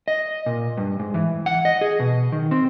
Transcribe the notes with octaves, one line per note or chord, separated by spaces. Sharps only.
D#5
A#2
G2
G#2
E3
F#5
D#5
G#4
B2
D#3
C4